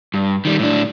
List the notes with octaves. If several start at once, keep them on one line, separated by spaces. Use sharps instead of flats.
G2
D#3 G3
A2 D4